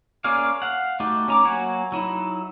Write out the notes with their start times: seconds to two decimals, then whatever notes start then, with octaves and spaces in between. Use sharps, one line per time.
0.24 A#3 C#4 G#4 D5 F5
0.62 F5 F#5
1.00 A3 D#4 F#4 G4
1.28 C#4 A#5 D6
1.45 F#3 A#3 F#4 F#5 G#5
1.92 F#3 D#4 E4